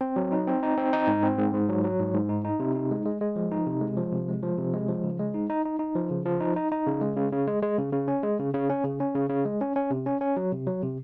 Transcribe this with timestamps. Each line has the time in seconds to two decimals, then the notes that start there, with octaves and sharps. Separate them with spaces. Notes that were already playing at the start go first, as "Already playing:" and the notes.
0.01 C4
0.16 F#3
0.32 D#4
0.47 C4
0.63 D#4
0.77 C4
0.93 D#4
1.07 G#2
1.23 C4
1.38 G#2
1.54 G#2
1.69 F#3
1.84 F#3
2.00 G#2
2.14 G#2
2.29 D#4
2.45 D#4
2.60 C3
2.75 D#4
2.91 G#3
3.06 G#3
3.21 G#3
3.36 F3
3.51 D#4
3.67 C3
3.81 G#3
3.97 F3
4.12 C3
4.28 G#3
4.42 F3
4.58 C3
4.74 G#3
4.89 F3
5.04 C#3
5.19 G#3
5.34 D#4
5.50 D#4
5.65 D#4
5.79 D#4
5.95 F3
6.10 C#3
6.26 F3
6.41 D#4
6.56 D#4
6.72 D#4
6.87 C#3
7.01 G#3
7.17 C#3
7.32 C#3
7.48 G#3
7.62 G#3
7.78 C#3
7.93 C#3
8.08 C#4
8.23 G#3
8.39 C#3
8.53 C#3
8.69 C#4
8.84 C#3
9.00 C#4
9.15 C#3
9.30 C#3
9.45 G#3
9.61 C#4
9.76 C#4
9.90 C3
10.06 C#4
10.21 C#4
10.37 F#3
10.52 C3
10.67 F#3
10.83 C3